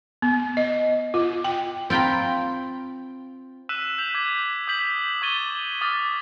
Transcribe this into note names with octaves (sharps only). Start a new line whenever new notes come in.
B3
D#5
F4
G5
C4 F4 G5 A#5 B5
E6 F#6 B6 D#7 E7
G6 B6 F7
D6 G#6 B6
D#6 G6 B6 F#7
C#6 D6 G#6 A6 D#7 G7
D6 D#6 F6 A6